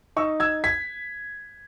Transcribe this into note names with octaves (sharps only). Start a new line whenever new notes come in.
D#4 C#6 E6
E6 G#6
G#6 B6